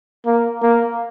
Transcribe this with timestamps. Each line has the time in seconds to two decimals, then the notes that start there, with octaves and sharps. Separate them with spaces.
0.26 A#3
0.62 A#3